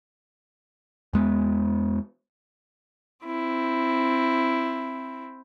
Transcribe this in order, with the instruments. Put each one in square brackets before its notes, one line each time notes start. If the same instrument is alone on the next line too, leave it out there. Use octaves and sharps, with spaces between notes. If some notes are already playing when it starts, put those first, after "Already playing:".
[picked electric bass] E2 G#3 B3
[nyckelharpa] C4 E4